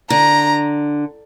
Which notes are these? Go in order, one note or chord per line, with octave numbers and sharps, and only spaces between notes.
D3 A#5